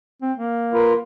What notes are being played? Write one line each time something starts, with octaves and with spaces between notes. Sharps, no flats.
C4
A#3
F4 A#4 B4